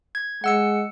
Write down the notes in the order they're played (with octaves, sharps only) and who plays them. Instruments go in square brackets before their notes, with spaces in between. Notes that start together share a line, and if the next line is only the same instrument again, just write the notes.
[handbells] G#6
[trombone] G#3 [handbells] F#5 E6 C#7